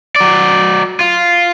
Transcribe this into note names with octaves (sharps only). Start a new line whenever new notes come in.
F#3 D5
F4